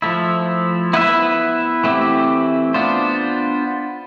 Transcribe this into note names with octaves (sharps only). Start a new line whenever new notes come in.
F3 A3 E4
B3 E4 B4 E5
E3 A3 C4 E4 G4
B3 D4 F4 C5